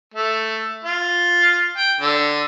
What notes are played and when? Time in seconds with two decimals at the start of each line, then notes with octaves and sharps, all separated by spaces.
0.14 A3
0.85 F4
1.78 G5
2.01 D3